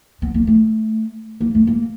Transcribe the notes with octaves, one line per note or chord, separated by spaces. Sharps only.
B3
A#3
A3
A#3
A3
A#3